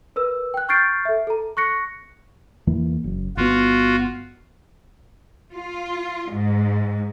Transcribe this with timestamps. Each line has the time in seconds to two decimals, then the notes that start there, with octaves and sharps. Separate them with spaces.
0.16 A#4 B4 E6
0.54 G5 F#6
0.69 C#6 F6 G6 A6 C7 D7
1.05 A4 E5
1.27 A4 A#5
1.57 C#6 F#6 A#6 C#7
2.67 E2 E3 A#3
3.04 F#1
3.37 G1 B3 F4 F#4
5.53 F4
6.28 G#2